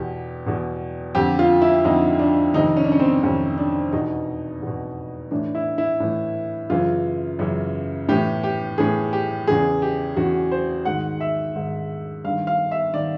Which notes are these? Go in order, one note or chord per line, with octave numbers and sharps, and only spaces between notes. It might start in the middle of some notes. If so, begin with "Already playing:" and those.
Already playing: E2 B2 G4
E2 B2
F2 D3 G4
F4
E4
F2 D3 D#4
D4
F2 C3 D#3 D#4
C#4
D4
C#4
C4
F2 C3 D#3 C#4
D4
E2 B2 D#4
E2 B2
A2 E3 D4
E4
E4
A2 E3
F#2 C#3 E3 F4
F#2 C#3 E3
A2 E3 G4
G4
A2 E3 G#4
G4
E2 C#3 E3 G#4
G4
E2 C#3 E3 F#4
C5
G#2 D#3 F#5
E5
G#2 D#3
G2 D#3 F5
F5
E5
D#3 D5